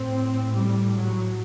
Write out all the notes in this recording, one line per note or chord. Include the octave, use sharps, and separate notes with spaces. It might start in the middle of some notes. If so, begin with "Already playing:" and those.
Already playing: A2 C4
G3
F#3